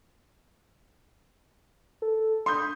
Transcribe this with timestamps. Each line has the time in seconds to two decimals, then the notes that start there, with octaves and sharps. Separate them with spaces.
2.02 A4
2.46 B5 C6 D#6 G6